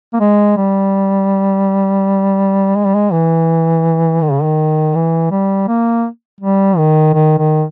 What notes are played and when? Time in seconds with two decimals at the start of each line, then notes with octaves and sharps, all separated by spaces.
0.13 A#3
0.20 G#3
0.56 G3
2.76 G#3
2.85 G3
2.95 G#3
3.12 E3
4.21 D#3
4.32 C#3
4.43 D#3
4.95 E3
5.31 G3
5.67 A#3
6.40 G3
6.77 D#3
7.14 D#3
7.38 D#3